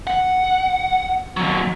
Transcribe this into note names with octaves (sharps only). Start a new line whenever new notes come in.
F#5
D#2 F#3